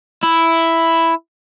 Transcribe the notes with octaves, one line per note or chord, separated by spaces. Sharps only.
E4